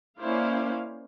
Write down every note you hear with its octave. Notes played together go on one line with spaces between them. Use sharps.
A#3 C#4 E4 C5 D5 F5